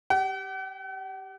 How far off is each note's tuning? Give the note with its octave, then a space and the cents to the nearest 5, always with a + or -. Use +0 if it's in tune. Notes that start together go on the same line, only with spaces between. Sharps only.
G4 +0 F#5 +45